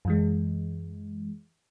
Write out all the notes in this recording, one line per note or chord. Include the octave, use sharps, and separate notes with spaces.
F#2 E3 G#3